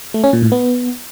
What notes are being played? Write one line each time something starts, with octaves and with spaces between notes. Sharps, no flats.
A3
C#4
A#2
A2
B3